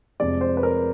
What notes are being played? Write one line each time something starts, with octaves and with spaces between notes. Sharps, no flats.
F1 F2 C3 F3 G#3 D5
C5
B4
A#4